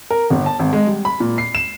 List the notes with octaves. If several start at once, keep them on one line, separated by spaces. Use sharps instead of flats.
A#4
G1
A5
G#1
G#3
G3
B5
A#2
C7
E7